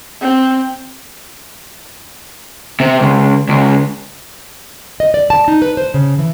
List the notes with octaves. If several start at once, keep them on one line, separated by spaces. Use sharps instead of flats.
C4
C3
C#2
C#2
D#5
D5
A5
D#4
B4
C5
C#3
E3